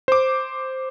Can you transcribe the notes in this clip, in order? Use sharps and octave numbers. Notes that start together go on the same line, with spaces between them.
C5 D6